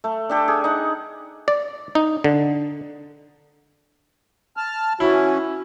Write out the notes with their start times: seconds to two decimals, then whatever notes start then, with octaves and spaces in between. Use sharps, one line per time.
0.04 A3
0.29 D4 G4 A4
0.48 G#4
0.64 D#4 F#5
1.48 D5
1.95 D#4
2.24 D3
4.57 A5 F6
5.00 E3 C#4 E4 F#4